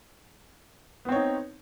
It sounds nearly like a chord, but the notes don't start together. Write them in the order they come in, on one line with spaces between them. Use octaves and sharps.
B3 C4 C#5 D#4